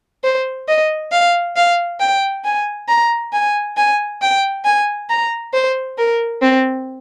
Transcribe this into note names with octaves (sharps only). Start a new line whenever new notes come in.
C5
D#5
F5
F5
G5
G#5
A#5
G#5
G#5
G5
G#5
A#5
C5
A#4
C4